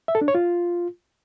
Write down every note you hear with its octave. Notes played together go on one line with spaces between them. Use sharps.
E5
A4
D4
C#5
F4